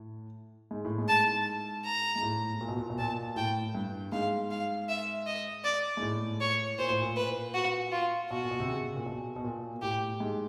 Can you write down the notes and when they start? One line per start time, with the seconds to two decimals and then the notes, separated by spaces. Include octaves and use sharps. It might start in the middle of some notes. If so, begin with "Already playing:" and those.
Already playing: A2
0.71 G#2
0.85 A2
0.98 G#2
1.08 A5
1.85 A#5
2.16 G#2
2.23 A2
2.61 A#2
2.68 B2
2.77 A#2
2.90 B2
2.98 A#2 A5
3.36 A2 G5
3.75 G2
4.12 G#2 F5
4.51 F5
4.89 E5
5.26 D#5
5.64 D5
5.97 G#2
6.02 A2
6.41 C#5
6.78 A#2 C5
6.90 A2
7.02 A#2
7.16 B4
7.54 F#4
7.92 F4
8.30 B2 F#4
8.43 A#2
8.51 B2
8.60 C3
8.68 C#3
8.96 A#2
9.06 B2
9.36 B2
9.44 A#2
9.82 A2 G4
10.20 G#2